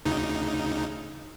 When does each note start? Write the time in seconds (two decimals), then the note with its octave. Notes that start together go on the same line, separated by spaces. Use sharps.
0.05 D2 C#3 D#4